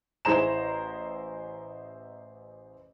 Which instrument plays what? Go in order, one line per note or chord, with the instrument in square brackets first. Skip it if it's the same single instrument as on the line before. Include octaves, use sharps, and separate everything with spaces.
[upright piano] A1 E4 G#4 C5 A#5 E7